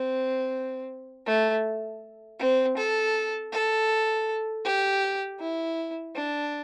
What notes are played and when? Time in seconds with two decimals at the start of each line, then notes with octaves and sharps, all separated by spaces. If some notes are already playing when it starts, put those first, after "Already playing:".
Already playing: C4
1.26 A3
2.39 C4
2.77 A4
3.52 A4
4.65 G4
5.40 E4
6.15 D4